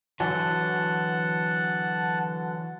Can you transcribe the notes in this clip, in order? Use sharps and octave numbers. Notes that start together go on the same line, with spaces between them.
D3 E3 F#3 F#5 A5